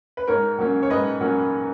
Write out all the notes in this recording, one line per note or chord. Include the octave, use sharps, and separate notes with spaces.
B4
G#2 A#4 C#5
F#3 A#3 C#4
C#5
G#2 B4 D#5
F#3 A#3 C#4